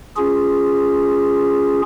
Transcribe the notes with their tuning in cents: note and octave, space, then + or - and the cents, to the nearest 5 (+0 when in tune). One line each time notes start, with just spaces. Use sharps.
C#4 +5 F4 +0 G#4 -5